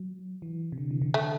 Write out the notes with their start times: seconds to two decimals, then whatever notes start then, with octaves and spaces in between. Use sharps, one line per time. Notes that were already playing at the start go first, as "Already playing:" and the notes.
Already playing: F#3
0.42 E3
0.72 C3
0.78 D3
0.91 E3
1.02 D3
1.14 A3